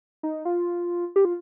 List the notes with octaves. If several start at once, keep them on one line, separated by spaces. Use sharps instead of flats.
D#4
F4
G4
F4